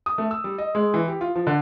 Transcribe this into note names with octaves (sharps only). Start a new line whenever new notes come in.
D#6
A3
E6
G3
D#5
G#3
E3
G4
F4
F3
D3